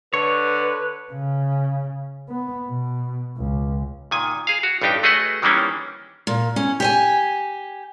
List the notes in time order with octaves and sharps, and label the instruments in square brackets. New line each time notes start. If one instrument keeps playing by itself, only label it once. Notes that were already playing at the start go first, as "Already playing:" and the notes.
[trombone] D3 [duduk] B4 [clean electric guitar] C#5
[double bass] C#3
B3
B2
C#2
[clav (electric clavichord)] A#2 D#3 G#5
G#4 F5
F#4
A1 G2 D4 D#4 G4 G5
A3 F#4 G#4 B4 D#5 F#5
D#3 E3 G3 A#3 C#4 D4
[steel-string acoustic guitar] A#2
C#4
G4 C#5 G#5